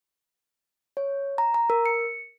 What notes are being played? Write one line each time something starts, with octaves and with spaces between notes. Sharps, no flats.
C#5
A#5
A#5
A#4
C#7